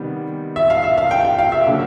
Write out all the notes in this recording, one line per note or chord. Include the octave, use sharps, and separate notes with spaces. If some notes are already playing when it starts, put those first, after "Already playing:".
Already playing: C3 D#3 G3 B3
E5
F5
E5
F5
G5
G5
F5
E5
D3 F#3 A#3